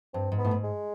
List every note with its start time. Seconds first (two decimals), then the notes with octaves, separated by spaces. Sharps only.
0.14 G2 C4
0.32 G#2
0.38 B3
0.45 A2
0.51 G#2
0.64 G#3